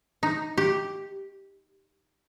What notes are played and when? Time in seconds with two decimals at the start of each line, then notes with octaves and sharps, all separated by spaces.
0.23 D#4
0.58 G4